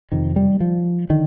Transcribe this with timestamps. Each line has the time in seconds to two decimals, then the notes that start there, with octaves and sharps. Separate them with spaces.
0.12 F2 C3 D#3
0.36 G3
0.60 F3
1.10 D3 D#3